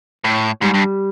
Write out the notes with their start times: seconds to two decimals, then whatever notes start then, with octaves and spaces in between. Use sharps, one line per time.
0.24 A2
0.62 G#2 G3
0.74 G2